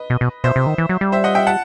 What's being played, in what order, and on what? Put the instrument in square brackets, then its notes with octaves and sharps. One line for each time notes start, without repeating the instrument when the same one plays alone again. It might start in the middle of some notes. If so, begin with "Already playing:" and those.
Already playing: [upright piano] B4 D#5
[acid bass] B2
B2
[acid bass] B2 [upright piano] C5 E5
[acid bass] C3
D#3
E3
F#3
G3
[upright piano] C5 E5
D#5 F#5
E5 G5
F#5 A5